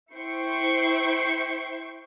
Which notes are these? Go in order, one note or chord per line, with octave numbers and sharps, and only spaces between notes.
E4 C5 G5 C#6 C7 C#7